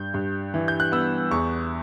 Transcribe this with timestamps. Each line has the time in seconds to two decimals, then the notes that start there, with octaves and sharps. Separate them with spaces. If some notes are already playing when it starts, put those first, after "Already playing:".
Already playing: G2 G6
0.14 G2
0.54 E3
0.68 G6
0.80 F#6
0.92 B3 E6
1.31 E2 C#6